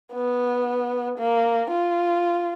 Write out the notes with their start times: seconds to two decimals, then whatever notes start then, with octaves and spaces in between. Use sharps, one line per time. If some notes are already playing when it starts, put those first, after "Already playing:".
0.13 B3
1.18 A#3
1.71 F4